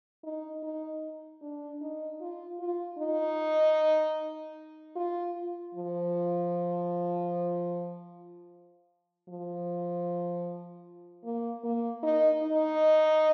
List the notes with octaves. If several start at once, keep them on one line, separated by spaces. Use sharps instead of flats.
D#4
D#4
D4
D#4
F4
F4
D#4
F4
F3
F3
A#3
A#3
D#4
D#4